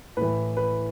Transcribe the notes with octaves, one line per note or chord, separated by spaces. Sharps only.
A2 E3 B4
B4